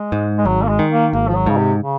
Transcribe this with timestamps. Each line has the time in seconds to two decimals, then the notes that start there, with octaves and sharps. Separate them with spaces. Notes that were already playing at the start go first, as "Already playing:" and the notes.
Already playing: G#3
0.12 G#2
0.38 G#3
0.45 G#1 F#3
0.63 A#3
0.69 G#3
0.79 D#3
0.91 A#3
1.13 G#1 A#3
1.28 F3
1.36 F#3
1.46 G#2 C#3
1.57 C3
1.80 C#3